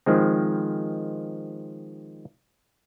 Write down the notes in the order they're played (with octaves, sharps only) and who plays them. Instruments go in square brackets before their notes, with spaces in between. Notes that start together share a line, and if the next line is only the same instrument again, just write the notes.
[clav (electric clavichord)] D#3 F3 G#3 C4